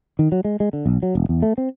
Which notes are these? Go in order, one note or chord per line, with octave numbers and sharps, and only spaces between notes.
D#3
F#3
G#3
G#3
D3
B1
F#3
E1
E2
A3
C4